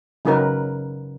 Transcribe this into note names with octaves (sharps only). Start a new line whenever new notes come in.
C#3 F#3 C#4 D#4 A#4 B4